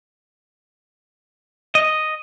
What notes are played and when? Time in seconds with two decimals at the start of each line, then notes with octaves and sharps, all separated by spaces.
1.75 D#5